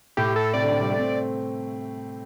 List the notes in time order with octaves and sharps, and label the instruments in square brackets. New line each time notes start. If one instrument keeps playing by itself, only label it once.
[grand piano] A2 [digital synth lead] G4
[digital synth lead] A4
[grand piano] C3 [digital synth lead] D5
[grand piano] D3
C3
G3
A3
C4